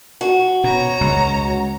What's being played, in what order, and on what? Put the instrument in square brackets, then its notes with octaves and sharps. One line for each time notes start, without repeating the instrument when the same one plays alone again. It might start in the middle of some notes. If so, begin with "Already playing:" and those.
[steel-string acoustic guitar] F#4
[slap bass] B2 [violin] C#5 A#5
[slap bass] C#2